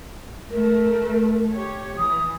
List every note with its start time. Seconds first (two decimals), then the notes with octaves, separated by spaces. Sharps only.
0.51 A3 A#4
1.55 G4 C#5
1.98 E3 D#6